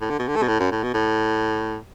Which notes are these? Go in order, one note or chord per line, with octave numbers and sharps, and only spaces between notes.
A2
D3
B2
D3
A3
B2
A2
F#2
A2
B2
A2